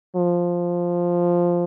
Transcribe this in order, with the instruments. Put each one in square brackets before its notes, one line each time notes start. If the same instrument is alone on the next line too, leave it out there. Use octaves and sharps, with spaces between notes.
[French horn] F3